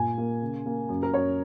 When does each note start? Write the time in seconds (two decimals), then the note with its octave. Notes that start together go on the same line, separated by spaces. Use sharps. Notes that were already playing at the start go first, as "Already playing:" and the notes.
Already playing: A#2 G#5
0.18 A#3
0.42 C#3
0.66 A#3
0.89 F#2
1.03 A#4
1.14 F#2 C#5